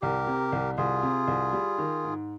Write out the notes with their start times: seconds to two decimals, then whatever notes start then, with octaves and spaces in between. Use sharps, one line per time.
0.02 C2 G4 A#4
0.27 C3
0.52 C2
0.78 C2 F4 G#4
1.03 C3
1.28 C2
1.53 G3
1.78 D#3
2.04 G#2